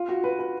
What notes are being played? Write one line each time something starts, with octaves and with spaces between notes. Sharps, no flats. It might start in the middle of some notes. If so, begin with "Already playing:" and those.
Already playing: F4
F#4
B4
B4